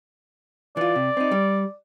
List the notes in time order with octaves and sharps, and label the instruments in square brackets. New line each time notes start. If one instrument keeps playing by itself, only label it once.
[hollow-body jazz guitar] E3 F4 [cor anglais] D5
[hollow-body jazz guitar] C3
C4 D#4
G3